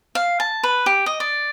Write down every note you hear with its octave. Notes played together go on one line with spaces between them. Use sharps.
F5
A5
B4
G4
D#5
D5